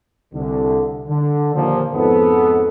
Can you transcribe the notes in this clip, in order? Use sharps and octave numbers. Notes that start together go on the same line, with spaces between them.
C2 D3
D3
D#2 A#2 F3
F2 G#2 B3 A4